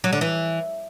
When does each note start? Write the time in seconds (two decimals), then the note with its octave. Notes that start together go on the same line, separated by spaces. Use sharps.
0.04 F#3
0.13 D3
0.21 E3